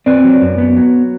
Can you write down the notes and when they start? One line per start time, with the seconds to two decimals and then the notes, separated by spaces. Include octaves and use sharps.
0.06 C4 B4 D5
0.24 F#3
0.42 F#2
0.58 B3
0.77 F#3